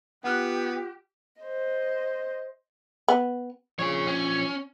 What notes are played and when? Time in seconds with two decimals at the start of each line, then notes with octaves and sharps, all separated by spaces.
0.24 B3 F4 G4 F#5 F6 F#6
1.41 C5 D#5
3.08 B3
3.79 F3 D4 F4 G#4 C#5
4.07 C#4